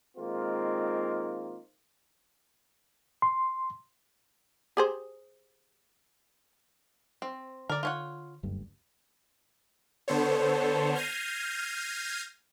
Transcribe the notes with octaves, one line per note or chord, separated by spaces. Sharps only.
D#3 G#3 A#3 C4 D#4 F4
C6
G4 G#4 C5
C4
D3 A#4 D5
F4 C#5 F#5
F#1 D2 G2
D3 B3 A4 C5 C#5
F6 G6 G#6 A#6 C7 D#7